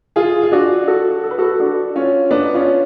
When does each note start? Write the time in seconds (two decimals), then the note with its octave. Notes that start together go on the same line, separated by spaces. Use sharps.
0.16 F4 G#4
0.43 F4
0.52 D4 F#4
0.87 F#4 A4
1.24 A4
1.31 B4
1.38 F#4 A4
1.60 D4 F#4
1.96 C#4 F4
2.31 B3 D4
2.55 C#4 F4